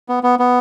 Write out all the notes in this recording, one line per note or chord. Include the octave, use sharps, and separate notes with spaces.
B3
B3
B3